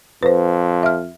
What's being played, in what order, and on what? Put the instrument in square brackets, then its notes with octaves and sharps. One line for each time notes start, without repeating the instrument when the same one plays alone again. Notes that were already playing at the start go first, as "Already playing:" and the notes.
[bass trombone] F2 [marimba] B4 C5
[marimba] E5 F6